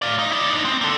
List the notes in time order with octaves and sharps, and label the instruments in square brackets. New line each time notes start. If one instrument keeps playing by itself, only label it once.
[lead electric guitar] D5 F5
D#4
E4 D5
D4 D#4
C4
A#3 A4